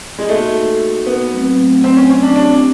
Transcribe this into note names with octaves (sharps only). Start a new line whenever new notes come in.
G#3
A3 A#3 D#4 F#4
B3
F#3 A3 C4
C4
C#4
C#4
D4
C4 D4 E4 G4